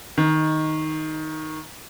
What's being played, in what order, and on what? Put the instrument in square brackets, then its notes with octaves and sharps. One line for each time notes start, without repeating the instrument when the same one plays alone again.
[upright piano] D#3